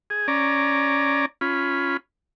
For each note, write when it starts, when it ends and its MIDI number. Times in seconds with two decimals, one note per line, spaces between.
0.10 0.27 68
0.28 1.26 61
0.28 1.26 74
0.28 1.26 82
1.41 1.97 61
1.41 1.97 65
1.41 1.97 83